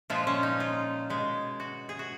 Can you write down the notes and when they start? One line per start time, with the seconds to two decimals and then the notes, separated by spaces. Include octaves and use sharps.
0.10 A#2 F3 G#3 F4
0.27 C#4
0.43 D#4
0.60 F4
1.10 B2 G#3
1.60 F#4
1.89 G#4
1.99 F#4